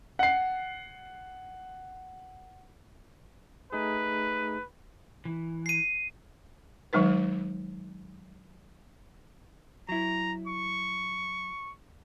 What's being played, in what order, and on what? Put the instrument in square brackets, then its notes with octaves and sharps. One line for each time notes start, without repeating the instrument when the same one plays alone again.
[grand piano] F#5 C7
[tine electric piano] A3 D#4 G#4 [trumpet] B4
[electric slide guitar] E3
[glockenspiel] C7 D#7
[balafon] D#3 F#3 G#3 D#4 B4
[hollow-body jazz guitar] F#3 E4 [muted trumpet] A#5
[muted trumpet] C#6